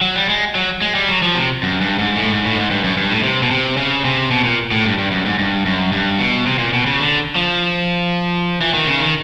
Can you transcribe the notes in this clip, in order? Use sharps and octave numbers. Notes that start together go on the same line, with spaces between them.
F#3
G3
G#3
F#3
G#3
G3
F#3
F3
C3
F#2
G2
G#2
A2
G#2
A2
G#2
G2
F#2
G2
A2
C3
B2
C3
C#3
C3
B2
A#2
A2
G2
G2
F#2
G#2
G2
F#2
G2
B2
C3
A#2
B2
C#3
D3
F3
E3
D#3
C#3
D#3